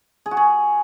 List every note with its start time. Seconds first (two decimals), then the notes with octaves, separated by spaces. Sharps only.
0.26 G#4
0.31 F#4
0.37 G#4